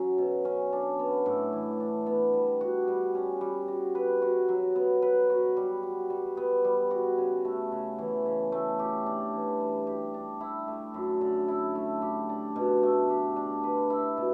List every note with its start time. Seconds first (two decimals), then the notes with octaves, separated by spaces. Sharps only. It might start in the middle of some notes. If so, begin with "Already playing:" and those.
Already playing: F#3 C#4
0.18 B2
0.45 C#4
0.72 D4
0.99 B3
1.26 A2
1.53 E3
1.80 D4
2.06 B3
2.33 G3
2.61 F#4
2.88 G3
3.15 C#4
3.41 G3
3.68 F#4
3.95 B4
4.22 F#4
4.48 F#3
4.76 B3
5.02 B4
5.30 F#4
5.57 G3
5.83 F#4
6.10 G3
6.37 B3
6.64 G3
6.91 F#4
7.18 C#3
7.45 A3
7.72 C#3
7.99 E3
8.26 C#3
8.52 A3
8.79 G4
9.06 D4
9.33 E3
9.60 G3
9.87 G4
10.14 D4
10.41 E4
10.68 A3
10.94 F#2
11.21 D3
11.48 E4
11.75 A3
12.02 G4
12.29 D4
12.56 B2
12.83 A3
13.10 G4
13.36 D4
13.63 B4
13.90 E4
14.17 B2